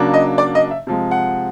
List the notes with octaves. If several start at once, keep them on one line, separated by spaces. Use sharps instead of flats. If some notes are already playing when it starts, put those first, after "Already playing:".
Already playing: C#3 F#3 A#3 D4
D#5
D5
D#5
E5
C3 F3 G#3
F#5